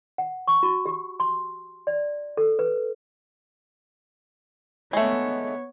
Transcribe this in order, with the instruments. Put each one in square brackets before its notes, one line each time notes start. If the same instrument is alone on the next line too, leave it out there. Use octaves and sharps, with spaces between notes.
[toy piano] F#5
C#6
F#4
G4
C6
D5
A4
B4
[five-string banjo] G#3 A3 [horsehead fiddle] B3 C#5